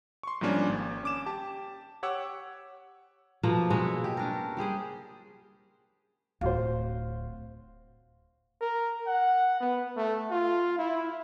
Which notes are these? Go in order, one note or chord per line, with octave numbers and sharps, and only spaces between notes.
C6 C#6
G#2 F3 G3 A#3 C#4 D4
G#1
C#4 D6 E7
G4 A5
G4 C#5 F#5 D6 E6
B2 F3 A3 A#3
G#3 E4 F#4 C#5
G4
C#4 D4 A#4
G3 G4 G#4 C5
D1 F4 F#4 C5
A#4
F#5
B3
A3
F4
E4